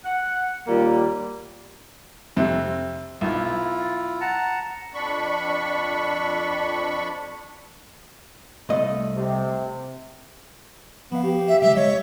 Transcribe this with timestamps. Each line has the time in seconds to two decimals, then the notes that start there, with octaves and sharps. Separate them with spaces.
0.05 F#5
0.67 D#2 G3 A#3 F4
2.37 F2 C3
3.21 B1 E4 F4
4.21 F#5 A5 A#5
4.94 F2 D4 B5 C#6
8.69 C2 A3 D5 D#5 F5
9.14 C3
11.12 F3 B3 F5
11.24 G4
11.48 E5
11.62 C#3 F#3 G#3 E5
11.76 G#3 C#5 D#5